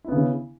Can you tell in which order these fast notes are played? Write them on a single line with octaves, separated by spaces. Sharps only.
E4 B3 C#3